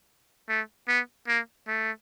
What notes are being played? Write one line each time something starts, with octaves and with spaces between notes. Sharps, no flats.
A3
B3
A#3
A3